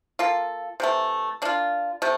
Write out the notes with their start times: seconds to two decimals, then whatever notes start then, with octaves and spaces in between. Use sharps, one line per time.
0.19 A#3 F4 A4
0.80 C3 E3 A3
1.42 A#3 D4 F4
2.02 C3 A3